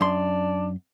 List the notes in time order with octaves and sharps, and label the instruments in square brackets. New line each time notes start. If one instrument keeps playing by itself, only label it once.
[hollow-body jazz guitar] F#2 C6 [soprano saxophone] D4